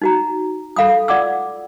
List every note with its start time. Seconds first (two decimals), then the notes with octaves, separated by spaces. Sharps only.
0.02 D#4 F#4 A#5
0.76 A4 F5 B5 D#6
1.08 F4 D5 F#5 D6 E6